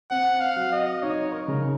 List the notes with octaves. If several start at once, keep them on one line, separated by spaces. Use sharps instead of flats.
C4 F#5
F5
F#3
D#5
D#4 C#5
A#4
C#3